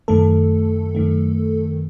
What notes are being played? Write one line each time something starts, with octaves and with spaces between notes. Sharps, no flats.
F#2 D#3 A3 A4
F#2 D#3 A3